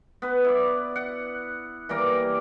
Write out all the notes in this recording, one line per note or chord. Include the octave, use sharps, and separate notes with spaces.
B3 B4
E4 D5
F#5
E3 G3 A#3 A#4